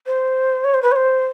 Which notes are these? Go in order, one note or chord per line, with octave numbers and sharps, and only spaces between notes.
C5
C#5
C5
B4
C#5
C5